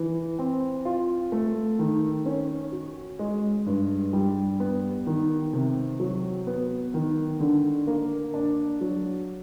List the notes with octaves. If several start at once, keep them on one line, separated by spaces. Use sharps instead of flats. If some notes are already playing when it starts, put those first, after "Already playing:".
Already playing: E3
C4
F4
A3
D#3
C#4
F#4
G#3
G2
G3
B3
D#3
C3
F#3
B3
D#3
D3
A#3
D4
F#3